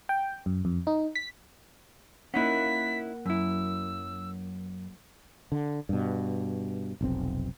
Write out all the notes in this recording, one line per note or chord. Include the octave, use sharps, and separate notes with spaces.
G5
F#2
F2
D#4
B6
A#3 C#4 D#4 E4 F#5 B6
F#2 F#3 E4 E6
D3
G2 B2
F1 B1 C4